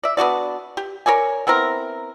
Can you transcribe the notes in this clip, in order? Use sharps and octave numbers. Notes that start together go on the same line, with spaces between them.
D5 E5
B3 D4 F#4 D5
G4
A#4 C#5 D5 G#5
B3 C4 E4 A#4